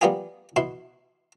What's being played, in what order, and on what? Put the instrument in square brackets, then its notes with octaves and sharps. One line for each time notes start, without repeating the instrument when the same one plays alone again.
[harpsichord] G3 A#3 B3 F4 G4 G#4
B2 E4 C6